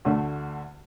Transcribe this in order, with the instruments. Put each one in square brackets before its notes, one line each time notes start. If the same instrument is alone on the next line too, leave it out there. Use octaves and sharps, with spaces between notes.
[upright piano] D2 D3 A3